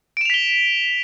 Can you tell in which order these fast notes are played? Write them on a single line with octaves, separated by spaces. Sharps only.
D7 E7 F7 B6 G7